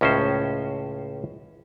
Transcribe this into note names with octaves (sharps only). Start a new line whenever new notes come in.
C#2 A2 C#4 A#4 C5